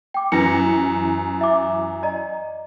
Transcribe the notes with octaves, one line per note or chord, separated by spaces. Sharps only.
G5 D6
F#2 E3 B4 A#6 C#7
E5 D6
D5 D#5 A#5